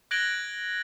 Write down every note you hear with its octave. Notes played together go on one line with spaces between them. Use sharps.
F#6 G#6 A#6 D7 F#7 G7